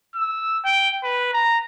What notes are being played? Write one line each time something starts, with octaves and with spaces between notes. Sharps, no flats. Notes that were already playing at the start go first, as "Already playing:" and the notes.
E6
G5
B4
A#5